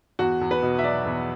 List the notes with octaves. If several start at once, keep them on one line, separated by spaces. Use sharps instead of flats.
E2 F#4
E2
B4
B2
E5
F#3 D5
E2